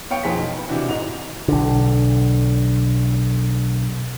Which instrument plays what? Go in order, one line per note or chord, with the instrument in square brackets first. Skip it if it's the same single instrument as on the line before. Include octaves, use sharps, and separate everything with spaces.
[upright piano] B3 C#5 F5 G5 C#6 C#7
B1 F2 G#4 C5 B6
D#3
B4
C3 E3 D4 E4 F#4
G#1 G#2 D#4 F7
[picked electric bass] B1 D3